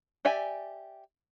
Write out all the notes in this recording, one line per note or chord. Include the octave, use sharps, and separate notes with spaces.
G4 D5 E5 G#5